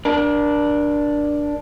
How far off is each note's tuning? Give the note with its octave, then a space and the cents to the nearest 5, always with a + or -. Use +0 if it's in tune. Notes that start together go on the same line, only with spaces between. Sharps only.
D4 +0 A#4 +35